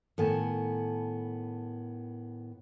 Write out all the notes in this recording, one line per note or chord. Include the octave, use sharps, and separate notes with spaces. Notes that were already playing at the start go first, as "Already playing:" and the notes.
A2 D#3 B3 G#5 A5